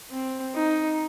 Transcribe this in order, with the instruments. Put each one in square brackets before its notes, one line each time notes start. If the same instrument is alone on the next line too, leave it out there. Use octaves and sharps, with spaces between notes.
[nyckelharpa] C4
D#4